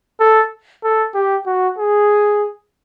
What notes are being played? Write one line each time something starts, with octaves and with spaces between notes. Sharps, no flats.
A4
A4
G4
F#4
G#4